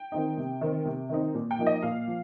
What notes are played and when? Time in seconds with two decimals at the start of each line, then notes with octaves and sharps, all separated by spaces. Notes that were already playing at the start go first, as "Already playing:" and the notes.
Already playing: G5
0.12 D#3 C4 D#4
0.38 C3
0.61 D#3 C4 D#4
0.85 C3
1.09 D#3 C4 D#4
1.35 A#2
1.51 G5
1.59 F3 A#3 D#4
1.67 D#5
1.82 A#2 F5
2.08 F3